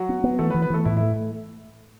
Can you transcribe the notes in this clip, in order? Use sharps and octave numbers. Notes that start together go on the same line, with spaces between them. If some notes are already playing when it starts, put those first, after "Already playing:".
Already playing: F#3 F#4
B3
B3
E3 A3 A4
B3 B4
E3
B3 B4
E3 A3 A4
A2 E4
A3 E4